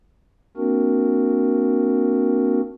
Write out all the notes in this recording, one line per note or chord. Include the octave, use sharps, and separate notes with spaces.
A#3 C4 D4 F#4 A#4